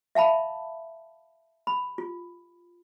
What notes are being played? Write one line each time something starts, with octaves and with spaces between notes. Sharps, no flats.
E5 F5 A5 B5
B5
F4